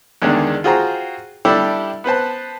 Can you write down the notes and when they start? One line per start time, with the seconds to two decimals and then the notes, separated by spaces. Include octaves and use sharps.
0.22 E2 D3 D#3 G#3 D4
0.64 F4 F#4 G#4 C5 G5 A#5
1.45 G3 D4 E4 G4 A4
2.04 B3 B4 C5 A5